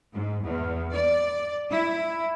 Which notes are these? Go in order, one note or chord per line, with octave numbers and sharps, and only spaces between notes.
G#2
E2
D5
E4